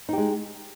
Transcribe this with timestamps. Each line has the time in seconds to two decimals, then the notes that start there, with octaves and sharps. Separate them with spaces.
0.09 D#4
0.13 G4
0.18 G#3